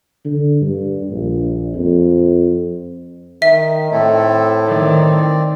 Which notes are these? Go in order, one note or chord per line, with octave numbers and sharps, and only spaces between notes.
D3
G2
A#1
F2
D#3 E5
A2 C4 E4 A4
D#3 C4 D5